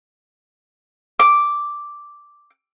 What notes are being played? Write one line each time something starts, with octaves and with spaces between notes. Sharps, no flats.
D6